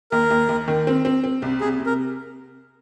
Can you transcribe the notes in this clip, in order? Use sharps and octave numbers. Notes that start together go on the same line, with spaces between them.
D#2 A#4
D#2
D#2
D#3
C4
C4
C4
C2
C3 G#4
C3
A#4